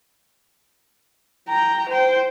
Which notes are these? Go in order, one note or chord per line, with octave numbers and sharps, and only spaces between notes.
G5 A#5
C5 G5